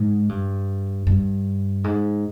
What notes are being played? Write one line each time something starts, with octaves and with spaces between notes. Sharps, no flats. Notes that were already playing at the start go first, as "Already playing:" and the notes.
Already playing: G#2
G2
G2
G#2